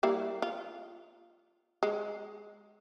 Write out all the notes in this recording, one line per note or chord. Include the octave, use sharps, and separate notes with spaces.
G3 A#3 E4
F4
G#3